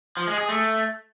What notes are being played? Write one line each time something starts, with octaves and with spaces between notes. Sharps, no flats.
F3
G#3
G#4
A3